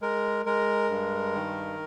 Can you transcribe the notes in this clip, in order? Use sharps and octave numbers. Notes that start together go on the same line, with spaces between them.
G#3 A#4
G#3 A#4
G2
D#3